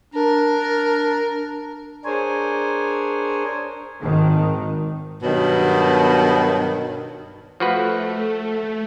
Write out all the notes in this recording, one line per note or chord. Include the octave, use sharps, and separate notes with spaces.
D4 A#4
D4 G#4 A#4 C5 C#5 G#5
G#1 D#3
G2 B2 D#3 F#3
F3 A3 F#4 B4